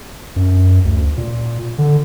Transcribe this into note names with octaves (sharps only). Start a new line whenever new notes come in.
F#2
D2
A#2
D3